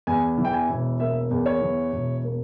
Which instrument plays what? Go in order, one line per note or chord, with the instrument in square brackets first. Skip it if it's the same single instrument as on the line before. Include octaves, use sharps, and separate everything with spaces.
[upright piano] E2 G#5
E3
G5
G#5
E1
A#3 E5
E2
C#5
E3
E1
A#3